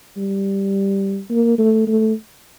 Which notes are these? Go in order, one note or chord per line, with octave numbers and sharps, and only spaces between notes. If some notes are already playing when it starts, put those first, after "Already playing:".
G3
A#3
A3
A3